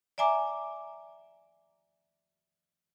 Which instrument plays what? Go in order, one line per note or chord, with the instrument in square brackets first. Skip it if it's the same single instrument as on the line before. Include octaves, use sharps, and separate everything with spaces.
[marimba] D5 E5 G#5 A#5 D6